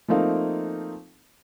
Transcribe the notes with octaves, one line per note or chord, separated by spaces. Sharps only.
F3 A3 A#3 C4 D#4 F5